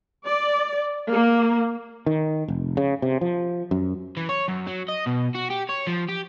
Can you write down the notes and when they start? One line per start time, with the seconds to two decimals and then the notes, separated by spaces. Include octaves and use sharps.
0.25 D5
1.11 A#3
2.06 D#3
2.48 F1
2.77 C#3
3.02 C3
3.21 F3
3.71 F#2
4.17 E3
4.29 C#5
4.48 F#2
4.67 F#3
4.88 D#5
5.06 B2
5.35 F#4
5.50 G4
5.69 C#5
5.87 F3
6.08 G4